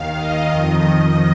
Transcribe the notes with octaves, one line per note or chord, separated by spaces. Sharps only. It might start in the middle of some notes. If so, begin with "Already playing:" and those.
Already playing: D#2 D#3 F5
D#5
F2 D#3